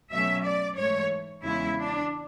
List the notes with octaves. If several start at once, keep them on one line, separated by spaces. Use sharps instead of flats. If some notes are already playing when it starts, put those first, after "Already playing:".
B2 F#3 A3 C#4 E5
D5
G#2 E3 A3 C#5
E2 C#3 G#3 C#4 E4
D4